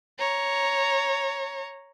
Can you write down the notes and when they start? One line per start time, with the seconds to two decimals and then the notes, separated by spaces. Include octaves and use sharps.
0.19 C#5 A#5